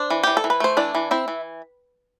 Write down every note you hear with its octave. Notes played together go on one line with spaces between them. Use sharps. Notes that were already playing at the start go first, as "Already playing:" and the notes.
Already playing: D4 C5
E3
E3 G4
A4
E3
B4
A3 C5
E3 D4 D5
E3
C4 E4 E5
E3